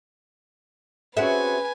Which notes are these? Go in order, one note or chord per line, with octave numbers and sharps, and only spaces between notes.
C4 C#4 F#4 G#4 B4 E5 G#5